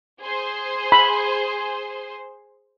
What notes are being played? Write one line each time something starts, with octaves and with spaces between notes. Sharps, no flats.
G#4 C5 C6
B5